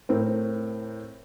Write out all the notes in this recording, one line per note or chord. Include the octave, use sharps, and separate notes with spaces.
A2 C4 A#4